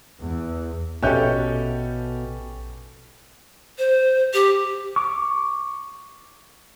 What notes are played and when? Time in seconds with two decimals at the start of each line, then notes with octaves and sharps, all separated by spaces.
0.20 E2
1.03 A#1 B2 C#4 G4 A4 E5 G6
3.78 C5
4.34 G4
4.96 C#6 D6